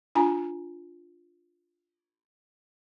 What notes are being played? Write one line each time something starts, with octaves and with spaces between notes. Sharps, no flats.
D4 F4 G#5 A#5